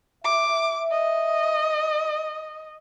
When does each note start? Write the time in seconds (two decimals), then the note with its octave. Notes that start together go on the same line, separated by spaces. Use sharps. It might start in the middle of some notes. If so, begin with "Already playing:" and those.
0.24 E5 D6
0.91 D#5